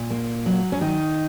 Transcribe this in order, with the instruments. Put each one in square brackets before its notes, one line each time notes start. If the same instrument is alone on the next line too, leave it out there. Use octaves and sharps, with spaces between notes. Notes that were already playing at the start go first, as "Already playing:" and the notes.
Already playing: [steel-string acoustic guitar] A#2
A#3
F#3
C#4
D#3 D#4